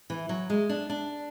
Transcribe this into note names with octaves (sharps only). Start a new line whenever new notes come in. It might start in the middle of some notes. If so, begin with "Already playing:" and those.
E3
F#3
G#3
D4
D4